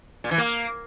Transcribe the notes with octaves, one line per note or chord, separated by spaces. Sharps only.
A#2
E3
A#3